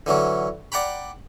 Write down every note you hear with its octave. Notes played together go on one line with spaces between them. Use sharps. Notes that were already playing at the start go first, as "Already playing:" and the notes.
D3 E3 F#3 C#4
D5 F#5 G5 A#5 B5